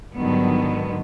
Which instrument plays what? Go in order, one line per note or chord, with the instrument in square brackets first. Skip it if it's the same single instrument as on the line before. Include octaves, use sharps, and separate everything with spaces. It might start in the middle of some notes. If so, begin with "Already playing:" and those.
[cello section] G#2 D3 D#3 F#3 G3 B3